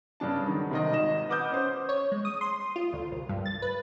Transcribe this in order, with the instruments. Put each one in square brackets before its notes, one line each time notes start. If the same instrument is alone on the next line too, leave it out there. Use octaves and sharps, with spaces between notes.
[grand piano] G2 C#3 D4 A5
D#3 F#3
C3 D#3 D#5
G#1 D#5 E7
B4 F#5 D6 D#6 G6
C#4 C5
[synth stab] C#5
G#3
D#6
C6
F4
D2
C2
G2
A6
B4